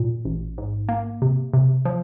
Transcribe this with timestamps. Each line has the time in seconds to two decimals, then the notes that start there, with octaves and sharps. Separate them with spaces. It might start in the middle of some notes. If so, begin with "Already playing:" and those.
Already playing: A#2
0.25 A1
0.58 G#2
0.89 A#3
1.22 C3
1.53 C3
1.85 F3